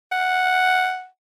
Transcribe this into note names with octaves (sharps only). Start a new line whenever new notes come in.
F#5